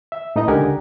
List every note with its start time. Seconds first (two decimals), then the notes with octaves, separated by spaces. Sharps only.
0.12 E5
0.36 A2 D#4 B4 D#5 A#5
0.48 C#2 D3 G4 A#4 F#5 G#5